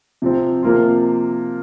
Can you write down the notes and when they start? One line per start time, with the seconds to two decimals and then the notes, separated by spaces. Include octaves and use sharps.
0.22 C3 F3 C4
0.63 C3 F3 A#3 F4